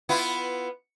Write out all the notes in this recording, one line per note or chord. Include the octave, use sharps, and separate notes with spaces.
B3 E4 F4